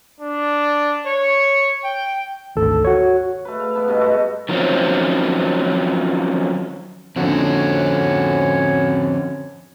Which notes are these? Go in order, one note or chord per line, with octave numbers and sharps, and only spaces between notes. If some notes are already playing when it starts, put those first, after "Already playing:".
D4
C#5
G5
G#1 D2 A4
F#4 C#5
A3 B4
F5
E3 B3 A5
G2 B2 A3 D#5
G#3 A3 F#4
D#3 F3 F#3 C4 C#4
F2 D3 C4 C#4 F#4 C#5